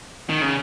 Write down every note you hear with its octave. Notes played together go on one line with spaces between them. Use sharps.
D#3
C#3